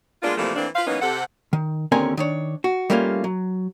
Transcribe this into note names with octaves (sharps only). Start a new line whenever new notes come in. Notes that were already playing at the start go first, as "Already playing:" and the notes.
G#3 A#3 B3 D4 F4
C3 E3 F3 G3 A3 A#3
E3 A3 A#3 C4 D4
F4 B4 C5 F5
E3 F#3 A#3 B3 C#4 D#4
C3 A4 F#5
D#3
D#2 D3 C4 C#4 A#4 G#5
D#3 D4 C#5
F#4
G3 A3 A#3 C#4 F4
F#3